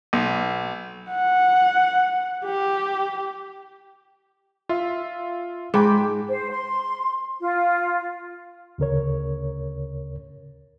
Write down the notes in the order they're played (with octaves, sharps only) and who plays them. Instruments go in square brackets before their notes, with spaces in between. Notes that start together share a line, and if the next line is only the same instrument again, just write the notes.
[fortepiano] B1
[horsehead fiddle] F#5
G4
[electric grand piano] F4 E5
[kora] G#2 [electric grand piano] G5 B5 D6
[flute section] C5
C6
F4
[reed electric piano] D2 C#3 A#4 C#5